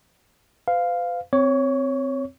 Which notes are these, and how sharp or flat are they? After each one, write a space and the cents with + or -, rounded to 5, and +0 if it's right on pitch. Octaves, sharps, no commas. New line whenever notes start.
B4 +45 F5 +0
C4 -10 C#5 +0 C#6 +40